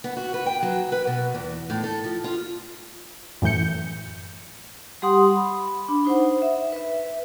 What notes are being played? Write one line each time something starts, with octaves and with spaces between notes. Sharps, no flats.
B3
F#4
B4
G5
F#3
B4
B2
E2
A2
A4
F3
F4
F#2 A2 E3 G6 C#7
G3 G4 F#5 C6 D#6
B5
D4 B5
D#4 C5 F#5
E5
B4 E5